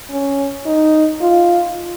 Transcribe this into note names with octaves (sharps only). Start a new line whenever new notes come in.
C#4
D#4
F4